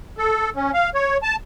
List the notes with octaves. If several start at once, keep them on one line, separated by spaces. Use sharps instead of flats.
A4
C#4
F5
C#5
A5